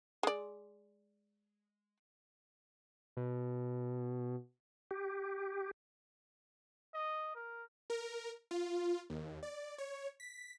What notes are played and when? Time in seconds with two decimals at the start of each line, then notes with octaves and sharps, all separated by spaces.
0.23 G#3 D5
3.17 B2
4.91 G4
6.94 D#5
7.35 A#4
7.90 A#4
8.51 F4
9.10 D#2
9.43 D5
9.78 C#5
10.20 B6